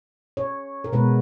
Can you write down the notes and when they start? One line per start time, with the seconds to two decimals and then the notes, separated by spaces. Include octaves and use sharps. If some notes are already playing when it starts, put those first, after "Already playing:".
0.37 C#5
0.84 A#4
0.92 B2 G#3 B3 B4